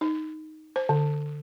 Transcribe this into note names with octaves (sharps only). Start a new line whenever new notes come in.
D#4
C5
D3